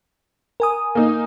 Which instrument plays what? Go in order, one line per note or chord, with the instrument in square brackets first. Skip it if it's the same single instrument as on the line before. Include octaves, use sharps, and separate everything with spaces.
[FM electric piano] A#4 G#5 D#6
[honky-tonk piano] A#3 D#4